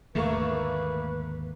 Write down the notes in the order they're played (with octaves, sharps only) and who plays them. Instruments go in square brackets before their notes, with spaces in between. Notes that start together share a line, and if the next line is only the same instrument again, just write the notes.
[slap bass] D#2 G#2 D3 [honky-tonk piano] A3 A#3 C#6 [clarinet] B4